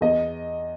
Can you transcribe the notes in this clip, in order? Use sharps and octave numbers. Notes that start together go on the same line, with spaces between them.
E2 D#5